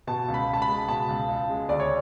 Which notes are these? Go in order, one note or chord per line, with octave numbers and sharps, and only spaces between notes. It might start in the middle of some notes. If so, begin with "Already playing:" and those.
B2 A5
C#2
B5
C#2 A5
B5
G#3
B2 A5
C#2
C#2
G#3
D2 D5
C#5